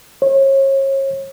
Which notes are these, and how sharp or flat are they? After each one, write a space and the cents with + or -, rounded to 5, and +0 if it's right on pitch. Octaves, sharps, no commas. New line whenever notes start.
C#5 -35